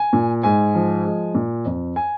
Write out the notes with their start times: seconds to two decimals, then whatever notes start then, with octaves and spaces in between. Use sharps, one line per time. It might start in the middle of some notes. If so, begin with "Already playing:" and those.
Already playing: G#5
0.13 A#2
0.43 G#2 G#5
0.74 F3
1.05 G#3
1.35 A#2
1.65 F2
1.96 G#5